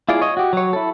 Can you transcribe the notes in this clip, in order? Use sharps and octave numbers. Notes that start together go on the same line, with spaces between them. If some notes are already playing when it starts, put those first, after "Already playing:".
E4 F4 G#4 D5
C#5 D#5
F#4 G4
F#3 C#5
E4 A4